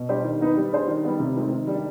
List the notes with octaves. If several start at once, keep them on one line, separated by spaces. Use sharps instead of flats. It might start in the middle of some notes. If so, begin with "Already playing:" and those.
Already playing: B2
G3 D4 G4 C5
D#3
B3 D#4 B4
G3
D4 G#4 C5
D#3
G3 B3
C3
D#3 G#3 C4
D#3
G3 D4